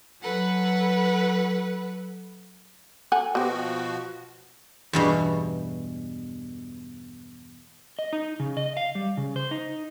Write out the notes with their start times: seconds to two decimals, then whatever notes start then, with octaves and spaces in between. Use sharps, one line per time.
0.22 F#3 A4 B4 F#5
3.12 A4 F#5 G#5
3.35 B2 F3 B3 F#4 G4
4.93 E2 G2 B2
7.99 D#5
8.13 D#4
8.40 C#3
8.57 D#5
8.77 F5
8.95 G3
9.17 C#3
9.36 C5
9.51 D#4